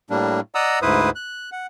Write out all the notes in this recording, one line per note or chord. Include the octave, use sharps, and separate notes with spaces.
A2 G3 A#3 D4
D5 D#5 F#5 A#5 D#6 E6
D2 G#2 E4 B4 C5 D#6
F#6
F#5